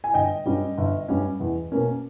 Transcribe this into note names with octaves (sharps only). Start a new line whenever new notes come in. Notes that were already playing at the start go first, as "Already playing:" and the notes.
G#5
G1 D#5 G5
G2 G3 C#4
G1
G2 G3 C#4
E2
B2 A#3 C#4